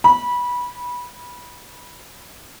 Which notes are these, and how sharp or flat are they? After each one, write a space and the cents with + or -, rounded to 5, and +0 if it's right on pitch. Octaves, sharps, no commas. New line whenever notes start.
B5 -20